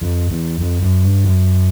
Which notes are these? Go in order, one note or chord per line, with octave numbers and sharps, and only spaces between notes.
F2
E2
F2
F#2
G2
F#2